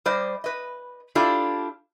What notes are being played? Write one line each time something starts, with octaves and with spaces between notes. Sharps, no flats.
G3 C5 D5 D#5
B4 D#5
D4 E4 F4 G4 A4 D5